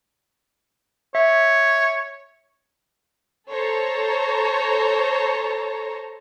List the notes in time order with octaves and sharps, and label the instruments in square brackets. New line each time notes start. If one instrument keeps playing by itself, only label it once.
[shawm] C#5 [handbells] E5
[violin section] A4 C5 C#5 A5 A#5